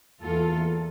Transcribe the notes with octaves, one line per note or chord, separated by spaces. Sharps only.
E2 E3 A#3 F4 A4